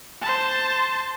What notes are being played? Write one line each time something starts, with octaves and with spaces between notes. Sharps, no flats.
C5 A5